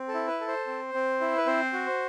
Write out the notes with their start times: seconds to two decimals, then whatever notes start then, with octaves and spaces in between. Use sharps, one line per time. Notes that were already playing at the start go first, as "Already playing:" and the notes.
Already playing: C4
0.08 A4
0.14 E4
0.28 B4
0.41 A4
0.48 C5
0.67 C4
0.94 C4
1.21 E4
1.37 B4
1.46 C4 C5
1.73 F#4